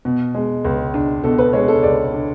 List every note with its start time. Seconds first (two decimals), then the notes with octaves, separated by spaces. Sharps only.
0.05 B2
0.35 G#3
0.65 C#2
0.94 D4
1.24 B2 A4
1.39 B4
1.53 G#3 C#5
1.68 A4
1.83 C#2 D5
2.13 D4